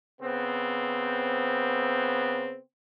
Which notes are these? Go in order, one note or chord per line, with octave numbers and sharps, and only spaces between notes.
C#3 B3 C4